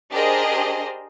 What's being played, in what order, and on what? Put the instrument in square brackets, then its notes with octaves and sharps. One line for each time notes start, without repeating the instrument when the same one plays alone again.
[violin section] D4 G4 G#4 A#4 C5 D#5